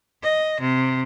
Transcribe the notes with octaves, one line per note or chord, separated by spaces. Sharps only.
D#5
C3